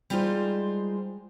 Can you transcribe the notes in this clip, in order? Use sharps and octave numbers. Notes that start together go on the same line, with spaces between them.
G3 G#3 D#4 F4 C5